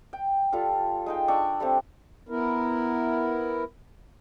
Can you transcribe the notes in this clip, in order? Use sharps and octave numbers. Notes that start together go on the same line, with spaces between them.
G5
G3 F4 A4 F5
G#3 D#4 G5
D4 G5 C#6 E6
G3 A3 C4
B3 E4 A#4